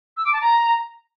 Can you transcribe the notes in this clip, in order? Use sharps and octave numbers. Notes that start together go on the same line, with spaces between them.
E6
D6
A5
A#5